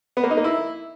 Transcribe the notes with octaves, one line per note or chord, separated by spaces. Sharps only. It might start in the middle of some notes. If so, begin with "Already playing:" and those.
B3
A#3
D#4
A#3
E4